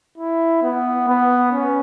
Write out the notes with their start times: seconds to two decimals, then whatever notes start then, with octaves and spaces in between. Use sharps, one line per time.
0.18 E4
0.62 B3
1.08 B3
1.52 C#4